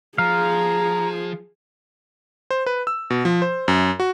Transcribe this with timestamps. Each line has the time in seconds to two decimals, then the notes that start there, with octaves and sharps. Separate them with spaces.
0.18 F3 G#4 F5 A#5
2.51 C5
2.66 B4
2.87 E6
3.10 B2
3.25 F3
3.42 C5
3.68 F#2
4.00 F#4